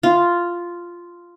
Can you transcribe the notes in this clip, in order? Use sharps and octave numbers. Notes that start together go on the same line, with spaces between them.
F4